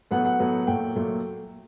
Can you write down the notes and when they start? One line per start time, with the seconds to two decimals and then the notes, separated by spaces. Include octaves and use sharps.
0.11 A2 F#3 B3 F#5
0.25 F#5
0.40 A2 F#3 B3
0.67 A#2 F#3 A3 G5
0.96 A#2 F#3 A3